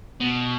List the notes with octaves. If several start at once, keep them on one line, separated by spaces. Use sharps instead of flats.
B2